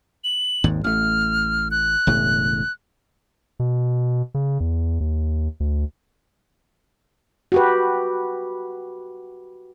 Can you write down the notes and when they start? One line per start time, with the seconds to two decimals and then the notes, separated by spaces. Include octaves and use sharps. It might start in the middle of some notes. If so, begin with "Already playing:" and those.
0.24 F#7
0.64 G#1 D#2 G#2
0.84 A1 A3 F6
1.71 F#6
2.07 E1 A2 C#3
3.59 B2
4.34 C#3
4.60 E2
5.00 D#2
5.60 D2
7.52 F#4 G4 B4